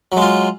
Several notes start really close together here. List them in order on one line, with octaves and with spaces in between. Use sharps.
F#3 G#3 F4